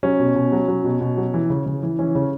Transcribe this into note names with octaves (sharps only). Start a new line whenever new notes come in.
F#3 C#4
B2
B2
F#3
F#3
B2
B2
F#3
E3
C#3
C#3
E3
E3 C#4
C#3